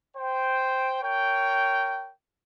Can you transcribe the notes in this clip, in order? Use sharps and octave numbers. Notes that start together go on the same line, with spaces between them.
C5 G5
A#4 C#5 G5